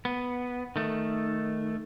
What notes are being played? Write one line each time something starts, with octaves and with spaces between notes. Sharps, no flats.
B3
D#3 A3